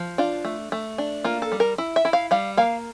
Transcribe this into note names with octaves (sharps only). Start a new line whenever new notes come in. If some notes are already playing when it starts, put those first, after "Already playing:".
Already playing: F3
D4 F4
A3
A3
D4
A#3 F4
A4
G3
A#4
E4
E5
E4
F5
G3 F5
A#3 F5